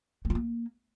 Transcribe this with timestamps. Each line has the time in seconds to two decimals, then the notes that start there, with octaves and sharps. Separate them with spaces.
0.25 A3
0.30 F4
0.35 A#3